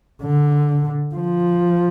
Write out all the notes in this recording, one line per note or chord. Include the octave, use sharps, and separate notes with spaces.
D3
F3